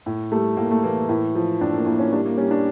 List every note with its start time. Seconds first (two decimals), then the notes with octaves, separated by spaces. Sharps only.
0.06 A2
0.32 G3 A3
0.57 A2 A#3
0.71 A3
0.84 E3 A#3
1.09 A2
1.35 F3
1.61 A2 D4
1.74 A#3
1.86 A2 A#3
1.99 C#4
2.13 G3 D4
2.26 A#3
2.38 G3 C#4
2.51 D4